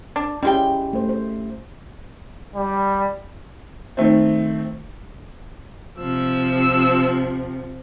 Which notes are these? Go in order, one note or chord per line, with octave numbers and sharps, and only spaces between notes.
D4
G3 G#3 C#4 E4 G4 G5
A3 C5
C5
G3
D#3 A3 C4
C3 F3 E6